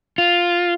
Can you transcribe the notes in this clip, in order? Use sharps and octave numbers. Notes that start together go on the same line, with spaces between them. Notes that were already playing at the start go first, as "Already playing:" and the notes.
F4